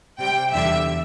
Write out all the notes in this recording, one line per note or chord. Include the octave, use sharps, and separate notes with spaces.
C3 G3 G5
E2 D3 G3 E5